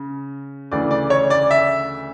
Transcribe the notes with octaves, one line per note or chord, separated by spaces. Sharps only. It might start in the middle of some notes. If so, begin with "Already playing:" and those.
Already playing: C#3
D2 C#3 E3 D5
D5
C#5
D5
E5